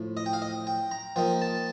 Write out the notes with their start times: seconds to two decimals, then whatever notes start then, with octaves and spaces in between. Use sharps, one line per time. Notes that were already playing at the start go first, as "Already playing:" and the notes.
Already playing: A2 F3
0.17 D#5
0.26 G5
0.33 F5
0.42 D#5
0.67 G5
0.91 A#5
1.16 F3 A#3 D#4 G5
1.42 A5